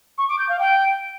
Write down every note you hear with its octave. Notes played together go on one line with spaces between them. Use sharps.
C#6
D6
G6
F5
G5